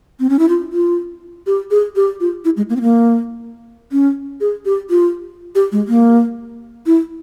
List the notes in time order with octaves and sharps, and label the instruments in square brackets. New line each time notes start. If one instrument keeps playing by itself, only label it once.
[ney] C4
C#4
E4
F4
F4
G4
G#4
G4
F4
E4
G#3
A#3
C4
A#3
C#4
G#4
G4
F4
G4
G#3
A#3
E4